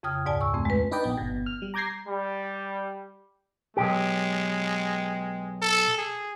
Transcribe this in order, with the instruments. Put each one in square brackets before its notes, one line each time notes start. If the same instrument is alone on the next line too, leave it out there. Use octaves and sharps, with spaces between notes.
[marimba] F2 C#3 G5 D#6 F6 G#6
D2 G#2 D5 G#5 A5
C#6 E6
F2 A3 C4
G#3 B4
[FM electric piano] D4 D#4 B4 D5 D#5 G5
A#1 B3
G1 B2
F6
G3
A#5 D6 G6 G#6 A#6 C7
[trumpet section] G3
[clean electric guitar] B1 F2 G4 [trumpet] G#3
[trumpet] A4
G#4